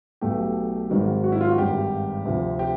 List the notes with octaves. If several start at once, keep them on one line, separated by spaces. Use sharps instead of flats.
B1 B2 F#3 A3 G4
G#1 G#2 D#3 F#3
F#4
E4
F4
F#4
G#1 G2 D#3 G3 G4
D2 C3 F3
G4